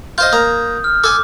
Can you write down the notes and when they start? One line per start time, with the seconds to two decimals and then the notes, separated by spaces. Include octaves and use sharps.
0.18 F4 C5 D#5 G6
0.33 A#3 A#5 D#6
0.84 F6
1.04 A4 G#5 D6